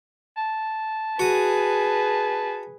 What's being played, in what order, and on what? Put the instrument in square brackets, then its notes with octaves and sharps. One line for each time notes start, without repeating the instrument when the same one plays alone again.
[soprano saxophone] A5
[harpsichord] F#4 D#6 [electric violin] G#4 B4